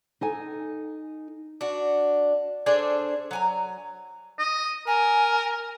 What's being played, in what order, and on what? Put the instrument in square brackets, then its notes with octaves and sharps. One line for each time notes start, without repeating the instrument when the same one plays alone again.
[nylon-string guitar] D#4 A4 G#5
[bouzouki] D4 F#4
D4 G#4 A4 C5
F#3 G#5 A#5
[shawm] D#5
[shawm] A#4 [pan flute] G#5